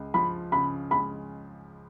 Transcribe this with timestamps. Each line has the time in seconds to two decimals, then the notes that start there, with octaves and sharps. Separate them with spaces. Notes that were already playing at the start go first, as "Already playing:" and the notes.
Already playing: C#2 G#3
0.14 F3 B5
0.52 C#3 B5
0.91 G#3 B5